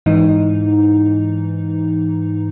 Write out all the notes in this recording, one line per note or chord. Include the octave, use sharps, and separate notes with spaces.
G#2 E3 D#4